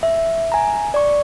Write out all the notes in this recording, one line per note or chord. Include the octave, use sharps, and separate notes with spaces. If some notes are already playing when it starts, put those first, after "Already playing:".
E5
G#5 A#5
D5 C#6